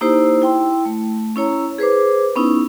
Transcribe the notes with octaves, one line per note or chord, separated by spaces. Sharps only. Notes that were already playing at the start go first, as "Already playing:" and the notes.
A#3 D#4 E4 G4 C5
E4 G5 C6
A3
C#4 E4 C#5 A#5
G#4 B4 C5 D6
B3 C#4 D#4 E4